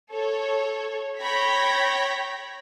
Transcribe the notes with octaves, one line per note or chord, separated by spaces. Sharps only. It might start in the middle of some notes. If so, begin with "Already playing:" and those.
A4 C#5
C#5 G5 B5 G#6 A#6 B6